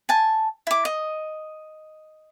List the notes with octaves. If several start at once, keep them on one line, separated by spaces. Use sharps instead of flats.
G#5 A5
E4 D6
D#5